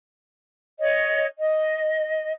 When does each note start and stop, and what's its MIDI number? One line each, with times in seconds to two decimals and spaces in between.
0.79 1.26 73
0.79 1.26 75
1.39 2.32 75